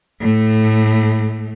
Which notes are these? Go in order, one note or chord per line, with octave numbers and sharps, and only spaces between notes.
A2 A3